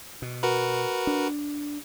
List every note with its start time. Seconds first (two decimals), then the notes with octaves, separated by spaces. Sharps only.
0.22 B2
0.43 F#4 A#4 B4
1.07 D4